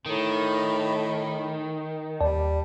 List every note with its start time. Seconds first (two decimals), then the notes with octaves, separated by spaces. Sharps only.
0.06 A2 D#3
2.21 D#2 G3 D5 A5